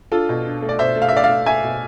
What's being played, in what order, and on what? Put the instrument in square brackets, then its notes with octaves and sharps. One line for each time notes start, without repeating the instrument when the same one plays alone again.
[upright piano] D4 F4 A4
B2
D4
A3
D5
B2 C5 E5
A3
F5
E5
A3 D5 F5
D5 F5
A3
A3 E5 G#5
B2